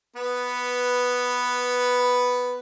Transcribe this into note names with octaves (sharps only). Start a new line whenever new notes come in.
B3 B4